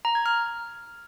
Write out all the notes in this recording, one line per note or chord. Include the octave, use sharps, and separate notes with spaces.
A#5
G#6
F6